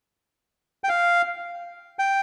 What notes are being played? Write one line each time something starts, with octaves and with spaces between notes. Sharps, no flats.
G5
F5
G5